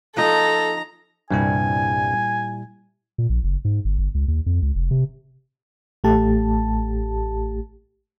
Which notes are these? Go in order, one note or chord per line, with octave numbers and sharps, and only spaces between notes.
F3 D#4 A4 A#5
C2 G2 A#2 G3 E4 G#5
A#2
A#1
F#1
G#2
G1
G1
C#2
D#2
F2
C#2
F1
C3
A1 A3 G4 A5